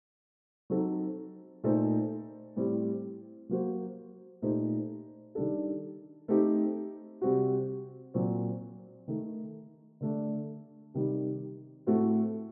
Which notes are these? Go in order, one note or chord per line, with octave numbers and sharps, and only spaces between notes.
F#3 C4 D#4 A4
A#2 A3 D#4 A4 C5
A2 G3 C4
F#3 A#3 F#4 C5
A#2 A3 D#4 G4 C5
D#3 G3 D4 A4
A3 C4 D#4 G4
C3 G3 C4 F#4
A#2 F#3 C4
D#3 A3 D#4
D3 A3 D4
C3 D#3 G3
A2 A3 C4 F#4